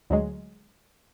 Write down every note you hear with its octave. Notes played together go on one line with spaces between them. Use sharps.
D2 F#3 G#3